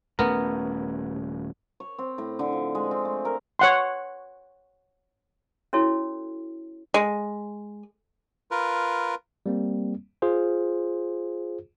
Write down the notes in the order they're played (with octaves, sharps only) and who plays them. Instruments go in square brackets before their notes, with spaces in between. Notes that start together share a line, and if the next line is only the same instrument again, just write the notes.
[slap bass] D#1 A3 C#4 [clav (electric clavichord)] B3 A#4
[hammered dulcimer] C#5
C4
A2
D3
F3
G#3
C4
A3
A#4
[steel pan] C#5 F#5 C6
[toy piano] C#4 E4 F#4 A4 C#5
[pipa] G#3
[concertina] F4 A#4 B4
[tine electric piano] G3 A#3 C4
F4 G#4 C5